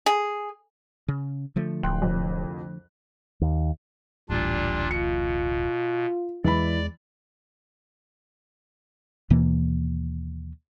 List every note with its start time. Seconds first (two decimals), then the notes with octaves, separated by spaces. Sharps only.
0.06 G#4
1.08 C#3
1.56 D3 F3 A3
1.83 D1 G5 C6 F#6
2.02 C2 F2
3.41 D#2
4.30 D1 A1 A#2 G3 D4 F4
4.91 B2 F4 C#7
6.44 E2 E3 G#3 D5 B5
9.30 D#2 B2 E3 A#3